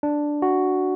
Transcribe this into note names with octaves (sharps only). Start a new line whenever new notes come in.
D4
F#4